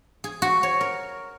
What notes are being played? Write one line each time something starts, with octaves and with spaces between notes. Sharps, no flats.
G#4
F#4
C#5
A#4